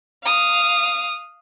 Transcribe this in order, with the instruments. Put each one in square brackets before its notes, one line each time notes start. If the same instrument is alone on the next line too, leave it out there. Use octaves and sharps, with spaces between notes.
[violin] F5 D#6